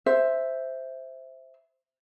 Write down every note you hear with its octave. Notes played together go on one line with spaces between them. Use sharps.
C5 E5